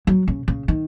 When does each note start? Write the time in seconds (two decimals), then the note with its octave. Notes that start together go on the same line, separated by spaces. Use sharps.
0.07 F#3
0.28 C#3
0.48 C#3
0.68 D#3